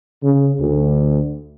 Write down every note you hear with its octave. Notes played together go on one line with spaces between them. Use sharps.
C#3
D2